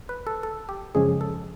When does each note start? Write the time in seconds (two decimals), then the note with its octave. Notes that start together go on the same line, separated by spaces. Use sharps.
0.09 B4
0.27 A4
0.43 A4
0.69 G4
0.95 F#2 C#3 F3 G#3 C#4 G#4
1.21 A4